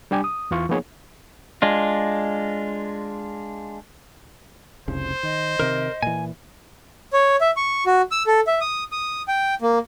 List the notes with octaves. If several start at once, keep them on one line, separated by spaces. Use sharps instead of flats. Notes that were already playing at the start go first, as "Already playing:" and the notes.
G3 D4 G4 G#5 D6
D#6
E2 E3 F4 C#6
F3 A#3 B3 D#4 G#4 C#5
G#3 D4 F4
F1 C2 C#3 C5
D#3 D#5
C3 D#3 A#4
A#2 E3 G#5
C#5
E5
C#6
F#4
E6
A4
E5
D#6
D#6
G5
A#3